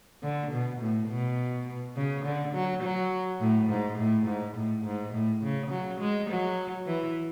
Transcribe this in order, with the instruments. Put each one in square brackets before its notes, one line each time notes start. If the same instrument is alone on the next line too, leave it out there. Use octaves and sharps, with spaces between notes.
[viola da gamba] D3
B2
A2
B2
C#3
D3
F#3
F#3
A2
G#2
A2
G#2
A2
G#2
A2
C#3
F#3
G#3
F#3
E3